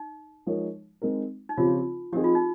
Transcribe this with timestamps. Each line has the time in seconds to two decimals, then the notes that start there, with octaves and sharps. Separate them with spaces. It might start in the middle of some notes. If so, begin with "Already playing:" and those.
Already playing: D#4
0.47 F3 G#3 D#4 A#4 C#5
1.02 G#3 C4 D#4 A#4
1.49 D#4
1.57 C#3 F3 C4 F4 G4 C#5
2.12 F3 C4 D#4 G4 G#4
2.24 F4
2.35 D#4